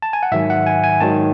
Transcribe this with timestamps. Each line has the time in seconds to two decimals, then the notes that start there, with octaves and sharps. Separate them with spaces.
0.02 A5
0.13 G#5
0.23 F#5
0.32 G#2 D#3 F#3 E5
0.50 F#5
0.66 G#5
0.83 G#5
1.01 G#2 D#3 F#3 A5